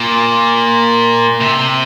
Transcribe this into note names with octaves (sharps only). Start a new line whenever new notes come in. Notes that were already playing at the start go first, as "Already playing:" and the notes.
Already playing: A#2
C3